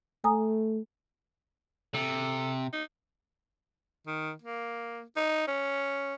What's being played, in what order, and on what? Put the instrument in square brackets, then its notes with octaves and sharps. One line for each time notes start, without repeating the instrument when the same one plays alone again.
[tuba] A3 [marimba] G#5 A#5 D#6
[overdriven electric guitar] C3 [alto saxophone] A4
[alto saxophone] D#4
[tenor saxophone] D#3
A#3
D#4
C#4